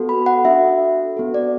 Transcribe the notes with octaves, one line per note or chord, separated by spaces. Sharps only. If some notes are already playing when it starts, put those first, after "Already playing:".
Already playing: B3 F#4 A4
B5
F#5
D4 F#4 A4 E5
B3 F#4 A4
D5